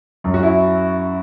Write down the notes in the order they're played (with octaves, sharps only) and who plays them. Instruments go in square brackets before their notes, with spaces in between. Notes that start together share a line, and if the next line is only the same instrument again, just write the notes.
[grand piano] F#2 F#3 C#4
F#4
E4